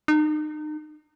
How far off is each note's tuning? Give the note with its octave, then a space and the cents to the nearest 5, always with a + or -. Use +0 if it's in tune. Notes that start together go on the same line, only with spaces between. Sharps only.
D#4 -35